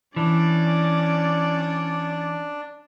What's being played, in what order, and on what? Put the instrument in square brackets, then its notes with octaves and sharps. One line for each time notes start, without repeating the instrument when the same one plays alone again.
[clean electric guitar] E3 [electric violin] C#4 D5 [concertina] D4